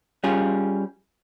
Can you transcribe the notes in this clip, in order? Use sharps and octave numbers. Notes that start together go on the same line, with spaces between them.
G3 C#4 F4 G#4